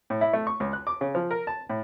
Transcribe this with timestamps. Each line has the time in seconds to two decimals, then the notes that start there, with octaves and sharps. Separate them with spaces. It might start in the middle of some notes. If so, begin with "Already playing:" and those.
0.10 A2
0.21 E4
0.33 A3
0.47 C#6
0.60 C#2
0.73 F#6
0.87 D6
1.01 C#3
1.15 F3
1.31 A#4
1.47 A5
1.69 A2